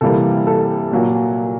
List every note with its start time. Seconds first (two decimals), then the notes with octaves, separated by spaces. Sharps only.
0.01 C3 E3 G3 A#3 A4
0.47 A4
0.91 A#2 F#3 A#3